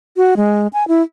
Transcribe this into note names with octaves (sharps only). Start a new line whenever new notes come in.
F#4
G#3
G#5
E4